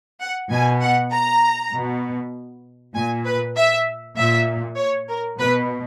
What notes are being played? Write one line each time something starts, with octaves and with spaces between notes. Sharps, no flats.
F#5
B2 G#5
F#5
A#5
B2
A#2 G#5
B4
E5
A#2 E5
C#5
A#4
B2 B4